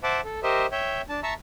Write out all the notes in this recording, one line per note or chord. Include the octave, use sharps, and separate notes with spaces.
C5 E5 F#5 A5 D6
A4
G4 A#4 C5 D#5 E5
C#5 E5 G5
D4 A5
E5 A5 A#5 C#6 E6